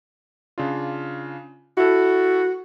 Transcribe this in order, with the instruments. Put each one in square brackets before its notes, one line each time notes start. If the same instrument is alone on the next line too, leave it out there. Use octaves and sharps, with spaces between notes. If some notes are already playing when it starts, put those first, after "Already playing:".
[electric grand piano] C#3 D4 F4
[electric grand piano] E4 A4 [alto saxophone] F#4